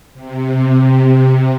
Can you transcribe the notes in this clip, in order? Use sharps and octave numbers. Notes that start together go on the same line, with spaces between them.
C3